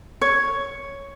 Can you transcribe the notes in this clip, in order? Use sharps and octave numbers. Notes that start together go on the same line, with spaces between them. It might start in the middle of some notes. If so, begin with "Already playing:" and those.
C#5